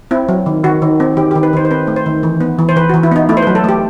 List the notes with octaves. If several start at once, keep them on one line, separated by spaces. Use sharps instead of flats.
C4 E4
F#3
D#3
D#3 F#4
D#3
C4
D#3 G4
D#3 G4
B4
D#3 C5
C5
C4 B4
A3
C5
D#3
E3
B3
E3
C5
E3 B4
E3 F#4
E4
B3 D#4
A3 E4
C5
F#3 B4
A4
A3 G4